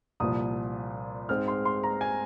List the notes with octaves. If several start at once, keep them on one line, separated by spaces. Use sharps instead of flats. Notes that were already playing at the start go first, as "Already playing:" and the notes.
C2 A#2 F3 D#6
G#2 G#3 C4 F6
C6
C6
A#5
G#5